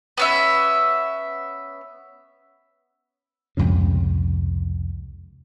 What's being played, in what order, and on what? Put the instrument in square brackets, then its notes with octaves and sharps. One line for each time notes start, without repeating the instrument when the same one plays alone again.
[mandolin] B3 C#4 E5
[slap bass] C2 F2 G#2 C#3